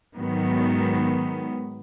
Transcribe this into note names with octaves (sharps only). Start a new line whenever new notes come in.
G#2 D#3 F#3 B3